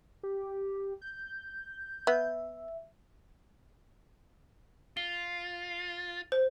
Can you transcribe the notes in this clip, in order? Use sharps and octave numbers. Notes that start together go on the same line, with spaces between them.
G4
G6
B3 E5
F4 G7
C5